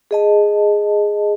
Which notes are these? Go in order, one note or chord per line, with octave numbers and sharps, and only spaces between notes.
G#4 D#5 A5